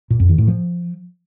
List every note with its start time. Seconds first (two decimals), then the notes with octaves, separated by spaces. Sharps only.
0.10 A#2
0.20 F2
0.29 D#3
0.38 A2
0.48 F3